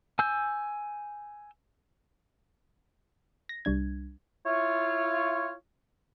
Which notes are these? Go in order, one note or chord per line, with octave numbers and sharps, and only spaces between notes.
G#5 E6 G6
A#6
C2 G3 D4 G#6
E4 F4 C#5